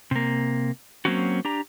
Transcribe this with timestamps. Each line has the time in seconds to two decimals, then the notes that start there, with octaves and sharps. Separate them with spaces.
0.11 C3 A#3
1.05 F#3 A#3 C4 C#4 F#4
1.45 D4 G4 A#5